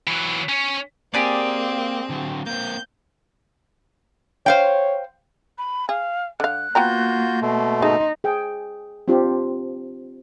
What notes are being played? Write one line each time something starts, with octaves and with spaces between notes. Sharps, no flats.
E3 F#3
C#4
A#3 C4 G4 G#4 D5
D3 F#3
A#3 C4 G6
C5 C#5 F5 G5
B5
G#4 F5
D3 F5 F#6
A#3 B3 F4 F#4 G5 A#5 G6
B2 A3 C6
D#4 G#4
G#4 G5
C4 D4 F4 G4